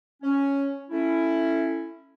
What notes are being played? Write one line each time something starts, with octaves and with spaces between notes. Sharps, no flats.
C#4
A3 C#4 E4